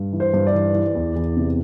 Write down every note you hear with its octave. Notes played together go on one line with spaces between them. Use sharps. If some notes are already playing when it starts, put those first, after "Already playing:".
Already playing: G2
E3
C5
G2
D5
E3
E3
E2
E2
C3